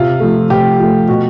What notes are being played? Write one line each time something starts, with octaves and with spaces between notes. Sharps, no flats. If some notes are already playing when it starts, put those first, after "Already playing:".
Already playing: C3 F4
F3 A3
C3 G4
F3 A3
B2 F#4